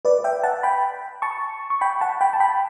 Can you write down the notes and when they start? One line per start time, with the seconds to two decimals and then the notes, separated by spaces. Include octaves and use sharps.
0.05 B4 D5
0.24 E5 G5
0.43 F#5 A5
0.63 G5 B5
1.22 A5 C#6
1.70 C#6
1.81 G5 B5
2.01 F#5 A5
2.21 G5 B5
2.33 A5
2.40 G5 B5